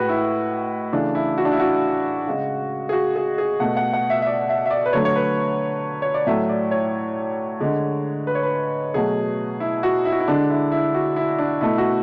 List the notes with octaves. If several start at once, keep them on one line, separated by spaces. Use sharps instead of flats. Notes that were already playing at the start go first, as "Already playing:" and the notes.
Already playing: A2 G#3 F#4 B4
E4
C#3 E3 A3 D4
E4
F#4
D4
E4
F#4
C#3 G#3
G#4
F#4
G#4
G#4
B2 A3 F#5
F#5
F#5
E5
E5
D5
E5
E5
D5
B4
D3 F#3 A3 C#5
C#5
B4
C#5
D5
A2 F#3 A3 E5
D5
C#5
D3 G#3
B4
C#5
B4
B2 F#3 A3 G#4
E4
F#4
E4
F#4
E4
D3 G#3 D4
E4
E4
F#4
E4
D4
B2 A3 E4
F#4